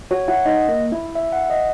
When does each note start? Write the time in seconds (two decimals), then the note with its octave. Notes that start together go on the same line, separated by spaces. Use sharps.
0.11 F#4 C#5
0.28 E4 F#5
0.45 D#4 D#5
0.69 A#3
0.92 E4
1.15 E5
1.32 F#5
1.50 D#5